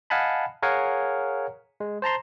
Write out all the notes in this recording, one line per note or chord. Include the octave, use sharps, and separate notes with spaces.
D#5 F5 F#5 G#5 A5 B5
G#4 A#4 C#5 F5 F#5 G#5
G#3
C5 A5 A#5 C6